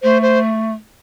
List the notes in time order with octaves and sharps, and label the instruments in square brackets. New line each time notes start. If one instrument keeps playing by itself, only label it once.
[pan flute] A3 [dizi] C5
[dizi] C5